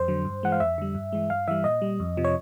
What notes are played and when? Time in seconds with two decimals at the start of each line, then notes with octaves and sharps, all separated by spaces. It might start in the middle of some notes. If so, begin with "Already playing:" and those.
Already playing: F2 C5
0.08 D3 F#3
0.25 G2
0.43 E3 G#3 F#5
0.52 F5
0.60 F2 E5
0.78 D3 G3
0.95 G2
1.12 E3 G#3
1.30 G2 F5
1.48 E3 G3 E5
1.64 A#2 D#5
1.82 G3
2.00 F2
2.17 C3 F3
2.24 C#5